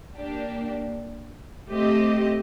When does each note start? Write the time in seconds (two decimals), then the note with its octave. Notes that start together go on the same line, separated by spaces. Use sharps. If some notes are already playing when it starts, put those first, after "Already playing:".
0.16 A#3 D4 G4
1.72 A3 C4 G4 C5 D#5